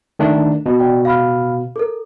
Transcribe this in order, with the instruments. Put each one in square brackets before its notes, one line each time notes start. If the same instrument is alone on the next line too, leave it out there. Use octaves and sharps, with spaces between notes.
[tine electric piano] D#3 A3 D4
B2
[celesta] D5 G5
F5 B5 F6
A4 A#4